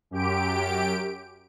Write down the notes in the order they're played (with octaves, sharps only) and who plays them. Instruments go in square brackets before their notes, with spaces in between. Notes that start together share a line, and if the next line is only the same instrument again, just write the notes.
[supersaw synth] F#2 G4 D7